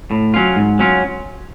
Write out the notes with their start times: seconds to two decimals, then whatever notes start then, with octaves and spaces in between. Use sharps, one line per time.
0.11 A2
0.34 F#3 C#4 F4
0.56 G#2
0.79 F#3 C#4 F4